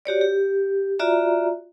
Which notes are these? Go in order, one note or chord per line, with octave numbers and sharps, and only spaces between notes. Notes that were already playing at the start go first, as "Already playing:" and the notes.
F#4 G4 C#5 D5
G4
F4 F#4 D5 E5 A#5